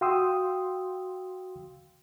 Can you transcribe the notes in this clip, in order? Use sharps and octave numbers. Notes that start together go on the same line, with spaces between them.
F#4 F5 G5 C6 D#6 E6